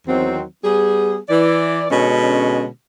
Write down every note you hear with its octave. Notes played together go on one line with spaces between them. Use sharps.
E2 D#3 F#3 C4
G3 B3 G#4
E3 D5
B2 D3 G#3 C#4